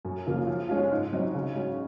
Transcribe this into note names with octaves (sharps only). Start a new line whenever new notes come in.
F#2
C#3 F3 A#3 F4
F3
G#3 C#4 F4
G#2
F#3 C4 D#4
C#3
G#3 C#4 F#4